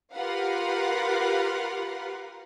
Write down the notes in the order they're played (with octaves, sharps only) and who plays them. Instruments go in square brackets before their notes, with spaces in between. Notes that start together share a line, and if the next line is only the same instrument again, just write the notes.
[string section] F4 G4 A#4 B4 F5 F#5